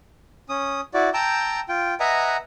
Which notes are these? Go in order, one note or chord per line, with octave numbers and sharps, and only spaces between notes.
C#4 D#6
E4 F#4 D5
G5 A5 A#5 E6 G6
F4 G5
B4 D#5 E5 F#5 G#5 A#5